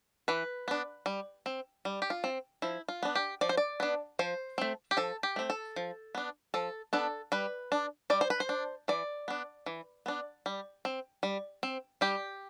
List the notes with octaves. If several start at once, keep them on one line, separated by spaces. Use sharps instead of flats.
E3 B4
B3 D4
G3
C4
G3
G4
F4
C4
F3 E4
F4
B3 D4
G4
F3 D5
C5
D5
B3 D4
F3 C5
A3 C4
G4
F3 A4
G4
A3 C4
A4
F3
B3 D4
F3 A4
B3 D4 A4
G3 B4
D4
G3 D5
C5
B4
C5
D4
E3 D5
B3 D4
E3
B3 D4
G3
C4
G3
C4
G3 G4